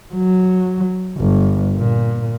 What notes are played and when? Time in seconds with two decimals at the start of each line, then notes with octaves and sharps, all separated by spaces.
0.15 F#3
1.17 G1
1.76 A#2